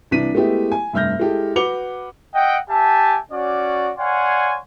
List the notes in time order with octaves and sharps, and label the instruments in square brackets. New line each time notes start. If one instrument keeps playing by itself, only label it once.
[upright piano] C2 E3 D4 B6 D#7
G#3 A3 B3 E4 G4
G#5
F1 G2 E5 F6 G6 A#6
G#3 E4 G4 A4
F#4 B4 D6 C#7 F7 G7
[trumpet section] D#5 E5 F#5 G5
G4 E5 G#5 A5
C#4 F#4 D5
C#5 D5 F5 F#5 G#5 C6